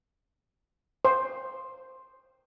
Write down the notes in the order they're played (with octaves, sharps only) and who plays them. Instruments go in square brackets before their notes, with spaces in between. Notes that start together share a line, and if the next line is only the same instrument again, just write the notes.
[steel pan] C5